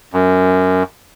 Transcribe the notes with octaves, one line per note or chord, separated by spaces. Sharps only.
F#2